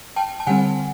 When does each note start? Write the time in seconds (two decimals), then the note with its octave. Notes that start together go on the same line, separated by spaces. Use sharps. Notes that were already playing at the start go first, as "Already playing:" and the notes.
0.16 G5 A5
0.40 A5
0.47 D3 G3 C4 F#5 G#5